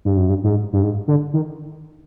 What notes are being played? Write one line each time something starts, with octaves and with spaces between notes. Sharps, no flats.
G2
F#2
G2
G#2
G2
G#2
D3
D#3